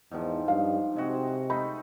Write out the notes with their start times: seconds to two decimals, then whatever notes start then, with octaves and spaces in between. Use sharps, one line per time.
0.11 E2 G#2 D#3 F3
0.48 G2 F5
0.96 C3 G#3 C4 F#4
1.50 G#3 A3 D#4 B5